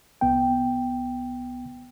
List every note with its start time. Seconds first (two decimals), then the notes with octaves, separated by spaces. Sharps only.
0.21 C2 B3 G5